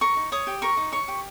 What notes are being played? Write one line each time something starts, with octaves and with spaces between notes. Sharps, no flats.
A#4 C#6
D#4
C#5 D#6
G4
A#4 C#6
D#4
C#5 C#6
G4